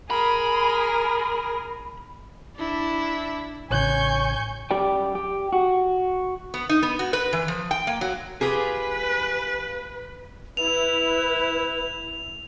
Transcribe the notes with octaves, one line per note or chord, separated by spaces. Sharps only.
G#4 A#4 B5
D4 E4
A1 C#3 C#5 G#5 C#6 G6
F#2 G4 D5 G5
G4
F#4
B3
D#4
B3
F#4
B4
E3
F3
G5
A#3
F#3
F4 G4 G#4 B4
E4 B4 F7